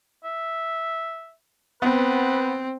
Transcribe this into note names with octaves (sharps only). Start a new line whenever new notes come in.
E5
B3 C4 B4